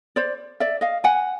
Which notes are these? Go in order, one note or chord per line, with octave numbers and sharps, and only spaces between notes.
C5 D5
D5 E5
D#5 F5
F#5 G#5